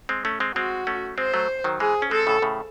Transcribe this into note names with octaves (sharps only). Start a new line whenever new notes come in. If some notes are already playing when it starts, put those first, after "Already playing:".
G#3 C4
A3 C#4
G#3 C4
G#3 C4 F#4
A3 C#4
G#3 C4 C5
F#3 A3
D#3 F#3
E3 G#3 G#4
C#4
G#3 C4 A4
A2 C#3
A2 C#3